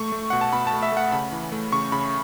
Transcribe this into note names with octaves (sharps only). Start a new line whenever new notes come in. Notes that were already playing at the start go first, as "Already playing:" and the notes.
Already playing: A3 C#6
A3
B2 F#5
A5
B2 B5
A5
A3
E5
A3 F#5
C#3 B5
E3
A3
C#3 C#6
C#3 B5